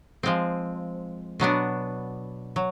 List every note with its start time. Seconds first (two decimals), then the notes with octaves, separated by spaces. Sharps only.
0.23 F3 G#3 C4
1.40 B2 F#3 B3 D4
2.56 F#3